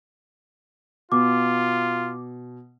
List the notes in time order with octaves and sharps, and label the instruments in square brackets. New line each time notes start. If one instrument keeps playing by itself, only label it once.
[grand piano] B2 [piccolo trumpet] F4 [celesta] D6